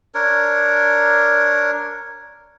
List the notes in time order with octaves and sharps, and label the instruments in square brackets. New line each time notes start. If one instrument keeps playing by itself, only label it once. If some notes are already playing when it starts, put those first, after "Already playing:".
[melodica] D4 A#4 C#5